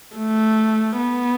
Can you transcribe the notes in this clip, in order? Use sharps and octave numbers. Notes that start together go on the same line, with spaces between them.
A3
B3